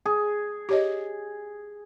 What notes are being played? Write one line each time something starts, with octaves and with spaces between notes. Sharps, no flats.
G#4
G4 C#5 D#5